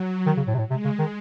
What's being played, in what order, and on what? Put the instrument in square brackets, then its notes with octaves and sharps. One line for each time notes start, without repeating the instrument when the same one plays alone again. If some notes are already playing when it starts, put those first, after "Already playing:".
Already playing: [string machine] F#3
[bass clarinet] D#3
C#3
A2
C3
A2
[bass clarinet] C3 [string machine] G#3
[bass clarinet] C#3
D#3